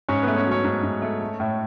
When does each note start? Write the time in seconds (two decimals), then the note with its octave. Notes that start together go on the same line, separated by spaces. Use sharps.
0.09 G#2 C#4 C#5
0.22 A3 B3 B4
0.37 C#4 C#5
0.46 F#3
0.51 C#4 C#5
0.64 G#2
0.83 G#2
1.02 A3
1.21 A3
1.40 A2